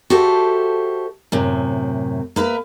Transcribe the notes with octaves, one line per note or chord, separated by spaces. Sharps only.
F#4 G4 A4 C5 E5
F#2 A2 C3
A#3 B4 E5